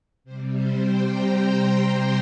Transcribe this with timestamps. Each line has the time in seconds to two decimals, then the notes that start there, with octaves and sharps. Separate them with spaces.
0.24 C3 G3 C5
0.53 C5
0.81 G5
1.08 A#5
1.37 C6